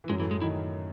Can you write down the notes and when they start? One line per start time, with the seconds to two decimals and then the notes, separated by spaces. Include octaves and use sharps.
0.04 E3
0.09 F#2 F#3 G#3
0.20 A2 E3 A3
0.31 G#3
0.41 D#3 D#4 E4